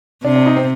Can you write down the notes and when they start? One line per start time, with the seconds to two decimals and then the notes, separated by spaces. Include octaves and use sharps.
0.25 C3 D4
0.36 D4
0.46 D#4
0.56 C4